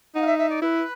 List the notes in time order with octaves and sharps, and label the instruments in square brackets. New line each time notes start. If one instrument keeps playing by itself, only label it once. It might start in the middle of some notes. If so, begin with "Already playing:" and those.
[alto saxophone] D#4 [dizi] F#5
[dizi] F5
E5
E5
D5
[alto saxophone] E4 [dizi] B4